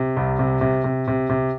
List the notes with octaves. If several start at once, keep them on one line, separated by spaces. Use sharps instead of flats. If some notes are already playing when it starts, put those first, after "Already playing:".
Already playing: C3
C2
C3
C3
C3
C3
C3